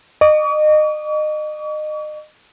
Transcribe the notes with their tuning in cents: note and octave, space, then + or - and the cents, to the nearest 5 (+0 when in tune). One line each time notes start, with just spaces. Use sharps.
D#5 -30 C#6 +45